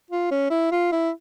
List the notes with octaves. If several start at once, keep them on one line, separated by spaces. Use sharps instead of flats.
F4
C#4
E4
F4
E4